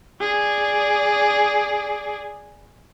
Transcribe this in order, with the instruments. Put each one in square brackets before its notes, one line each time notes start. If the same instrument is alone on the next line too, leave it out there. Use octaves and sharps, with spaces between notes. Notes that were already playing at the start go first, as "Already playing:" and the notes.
[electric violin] G#4 D5